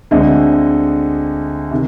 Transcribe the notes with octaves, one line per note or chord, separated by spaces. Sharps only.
D2 D3 G#3 C4 D#5
C3 D#3